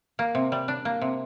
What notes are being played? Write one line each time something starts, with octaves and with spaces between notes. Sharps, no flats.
A#3
C3
G3
D4
A#3
C3